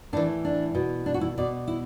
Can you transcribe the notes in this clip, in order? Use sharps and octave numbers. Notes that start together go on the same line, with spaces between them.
A2 E3 D4
D4
B2
D4
F#4
E4
B2 D5
E4